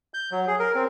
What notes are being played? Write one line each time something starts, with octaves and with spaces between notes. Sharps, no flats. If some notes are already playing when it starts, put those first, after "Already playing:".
G6
F#3
G#4
A#4
C4